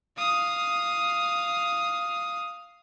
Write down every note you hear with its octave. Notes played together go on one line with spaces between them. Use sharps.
F5 D#6